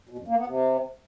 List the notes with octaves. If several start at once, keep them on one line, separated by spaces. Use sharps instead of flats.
B2
F#2
A#3
B3
C3